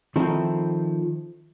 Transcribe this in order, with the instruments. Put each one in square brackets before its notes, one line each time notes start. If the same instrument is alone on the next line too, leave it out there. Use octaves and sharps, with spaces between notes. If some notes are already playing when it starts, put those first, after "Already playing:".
[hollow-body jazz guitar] D#3 F3 C4 E4 A4